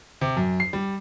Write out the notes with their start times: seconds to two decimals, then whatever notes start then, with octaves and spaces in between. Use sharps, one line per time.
0.21 C3
0.37 F#2
0.60 C7
0.73 G3